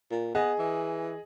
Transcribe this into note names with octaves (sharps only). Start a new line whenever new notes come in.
A#2
B3 G#4 D#5
E3